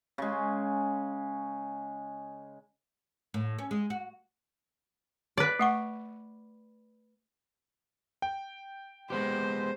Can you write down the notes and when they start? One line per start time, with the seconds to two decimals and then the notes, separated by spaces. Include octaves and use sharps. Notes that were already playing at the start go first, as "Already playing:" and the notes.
0.18 C#3 G#3
3.34 A2
3.59 C#4
3.71 G#3
3.90 F#4
5.37 B4 D5
5.59 A3 F#5 C#6
8.22 G5
9.10 G#3 B3 G4 C5